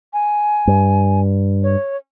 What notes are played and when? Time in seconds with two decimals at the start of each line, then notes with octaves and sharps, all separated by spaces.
0.13 G#5
0.67 G2
1.63 C#5